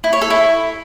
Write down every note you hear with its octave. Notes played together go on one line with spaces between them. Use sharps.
E4
C#5
A4
E4